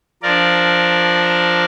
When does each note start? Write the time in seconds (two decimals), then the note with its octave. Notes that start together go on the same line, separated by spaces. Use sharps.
0.23 F3 D4 A#4 D5